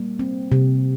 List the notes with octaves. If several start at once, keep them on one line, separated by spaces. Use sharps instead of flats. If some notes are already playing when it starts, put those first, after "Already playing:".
Already playing: G3 A#3
C4
C3